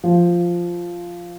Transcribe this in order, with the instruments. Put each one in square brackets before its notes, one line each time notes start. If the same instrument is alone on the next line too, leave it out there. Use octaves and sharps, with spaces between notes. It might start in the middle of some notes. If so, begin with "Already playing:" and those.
[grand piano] F3